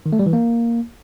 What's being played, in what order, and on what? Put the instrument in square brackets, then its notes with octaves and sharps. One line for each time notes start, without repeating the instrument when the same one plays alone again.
[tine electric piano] D#3
A3
G3
E3
A#3